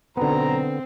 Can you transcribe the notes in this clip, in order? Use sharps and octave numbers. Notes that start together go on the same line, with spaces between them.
B1 D3 B3 C4 C5 A#5